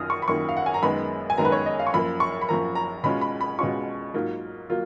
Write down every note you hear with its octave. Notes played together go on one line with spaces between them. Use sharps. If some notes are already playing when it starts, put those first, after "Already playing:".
Already playing: F#2 D#3 F4 D#6 F6
C#6
B5
F#2 D#3 A#3 F4 C#6
F5
F#5
G#5
A#5
F#2 D#3 G#3 B3 B5
G#5
F#2 D#3 G#3 B3 A#5
B4
C#5
D#5
F5
C#6
F#2 F3 A#3 B5
C#6
B5
F#2 F3 A#3 A#5
A#5
B2 G#3 C#4 F4 B5
B5
B5
B2 G#3 C#4 F4 C#6
G#2 F#3 A#3 F4
F#3 A#3 F4